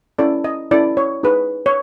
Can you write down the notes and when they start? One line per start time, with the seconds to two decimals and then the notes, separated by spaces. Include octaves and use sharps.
0.18 C#4 E4 A4 D5
0.44 D#5
0.71 C#4 E4 A4 D5
0.97 C#5
1.23 D#4 G#4 B4
1.66 C#5